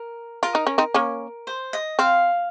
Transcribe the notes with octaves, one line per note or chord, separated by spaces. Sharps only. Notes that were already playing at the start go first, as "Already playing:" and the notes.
Already playing: A#4
F4 A#4
D#4
C#4
C4 D#4
A#3 C#4
C5
D#5
C4 F5